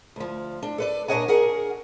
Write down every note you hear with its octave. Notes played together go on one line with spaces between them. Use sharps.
D2 F3
D4
A4 B4 D5
A#2 D4 C#5 D#5 F#5 G#5
G#4 A#4 F#5